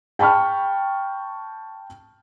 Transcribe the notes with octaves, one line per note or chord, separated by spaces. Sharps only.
G5 A5 B5 C#6 F6